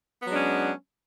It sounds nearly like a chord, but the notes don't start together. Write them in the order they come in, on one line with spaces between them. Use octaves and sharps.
B3 F#3 G#3 D4 C#4